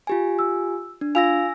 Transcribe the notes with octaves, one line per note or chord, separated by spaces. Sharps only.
F4 G4 G#5
E6
D4
F4 F5 G#5 E6 A#6 F7